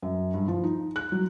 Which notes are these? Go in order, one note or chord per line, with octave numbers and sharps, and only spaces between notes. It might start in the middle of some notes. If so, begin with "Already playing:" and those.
F#2
G2
F3
D#4
F#6
F#3